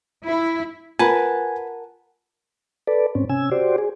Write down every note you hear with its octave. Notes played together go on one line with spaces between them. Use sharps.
E4
F4 A#4 B4 F#5 G#5 A5
A4 B4 D5
G#2 C4 C#4
C3 C#4 G#5 E6
F#4 G4 C5 D5
G#4